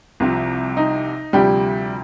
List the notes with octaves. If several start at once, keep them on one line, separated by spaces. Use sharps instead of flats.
C2 C3 F3
D#4
D2 C3 F3 G3 G4